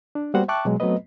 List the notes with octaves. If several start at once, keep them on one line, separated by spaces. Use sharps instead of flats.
D4
G3 A#3 B3 F#4 C5 F#5
E5 G5 A5 C#6 D6 F#6
B2 F#3 G#3
F#3 A3 B3 C4 B4 D#5